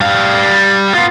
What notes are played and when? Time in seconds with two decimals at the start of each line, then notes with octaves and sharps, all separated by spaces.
0.01 G3 F5
0.94 B3 F4